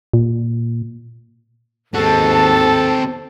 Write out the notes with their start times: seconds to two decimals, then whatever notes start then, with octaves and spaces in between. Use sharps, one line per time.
0.14 A#2
1.94 D#2 G#2 C4 F#4 A4 A5